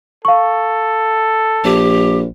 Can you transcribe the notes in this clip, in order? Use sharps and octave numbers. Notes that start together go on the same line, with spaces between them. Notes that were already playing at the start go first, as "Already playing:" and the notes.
A4 F5 C#6
A#1 G4